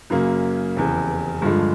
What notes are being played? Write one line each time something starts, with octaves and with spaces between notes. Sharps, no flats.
F#2 C#3 F#3 A#3
F1 E2 C#3
G2 D3 F3 G#3